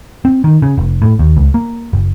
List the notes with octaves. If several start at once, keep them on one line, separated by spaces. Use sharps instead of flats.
C4
D#3
C#3
F1
A2
D#2
C#2
A#3
F#1